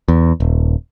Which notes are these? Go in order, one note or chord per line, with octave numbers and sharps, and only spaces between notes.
E2
D#1